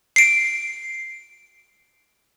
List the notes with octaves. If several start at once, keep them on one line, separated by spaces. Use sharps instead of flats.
C7 D7